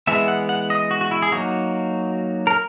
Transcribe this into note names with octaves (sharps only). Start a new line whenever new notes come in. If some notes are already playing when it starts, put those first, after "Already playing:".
E3 G#3 B3 E5
F#5
F#5
D#5
F#4
F#4
E4
G#4
F#3 A#3 D#4 F#4
A#4